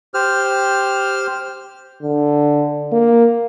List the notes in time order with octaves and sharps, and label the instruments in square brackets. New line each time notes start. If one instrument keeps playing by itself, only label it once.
[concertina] G4 C5 F6
[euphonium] D3
A#3